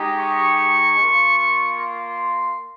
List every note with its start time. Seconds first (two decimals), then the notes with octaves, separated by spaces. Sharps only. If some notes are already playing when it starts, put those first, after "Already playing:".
Already playing: G#3 D#4 G4
0.20 C#6
0.98 A#3 F4
1.76 C6